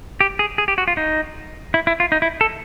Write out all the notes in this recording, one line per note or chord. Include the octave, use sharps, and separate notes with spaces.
G4
G#4
G#4
G4
F#4
F4
D#4
E4
E4
F4
D#4
E4
A4